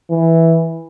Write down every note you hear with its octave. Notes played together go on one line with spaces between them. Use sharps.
E3